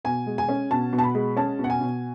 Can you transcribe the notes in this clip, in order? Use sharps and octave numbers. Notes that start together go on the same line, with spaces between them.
B2 G#5
G#3
G#5
C#4
B2 A5
B2
A5
B5
G#3
C#4 A5
B2 F#5
G#5
B2